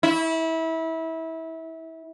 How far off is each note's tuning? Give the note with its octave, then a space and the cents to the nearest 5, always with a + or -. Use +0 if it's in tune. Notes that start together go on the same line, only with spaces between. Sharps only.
E4 -25